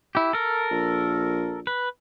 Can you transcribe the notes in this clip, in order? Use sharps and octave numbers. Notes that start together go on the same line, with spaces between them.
E4 G4
A4 A#4
A#1
B4